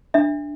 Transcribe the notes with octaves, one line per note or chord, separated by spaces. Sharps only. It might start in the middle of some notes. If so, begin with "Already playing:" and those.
D4 E5